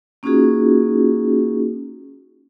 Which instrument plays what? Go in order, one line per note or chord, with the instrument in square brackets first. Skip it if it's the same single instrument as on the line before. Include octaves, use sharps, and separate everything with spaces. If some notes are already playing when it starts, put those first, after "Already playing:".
[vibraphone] A#3 C#4 D#4 F4 F#4 G#4